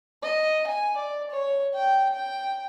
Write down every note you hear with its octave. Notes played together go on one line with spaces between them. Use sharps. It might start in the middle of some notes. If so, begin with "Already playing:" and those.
D#5
G#5
D5
C#5
G5
G5